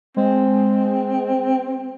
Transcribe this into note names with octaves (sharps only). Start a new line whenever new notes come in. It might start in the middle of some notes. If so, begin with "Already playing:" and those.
G#3 C4